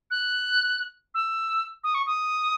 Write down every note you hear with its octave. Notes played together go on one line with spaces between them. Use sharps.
F#6
E6
D#6
C#6
D#6